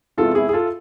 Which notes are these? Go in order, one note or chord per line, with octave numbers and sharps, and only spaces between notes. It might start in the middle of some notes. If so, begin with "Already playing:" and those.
E2 C3 E3 G#3 F4 A4
E4 G#4
G#4
F4 A4